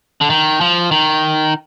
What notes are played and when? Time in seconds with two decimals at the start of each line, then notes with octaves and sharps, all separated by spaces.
0.21 D3
0.30 D#3
0.61 F3
0.91 D#3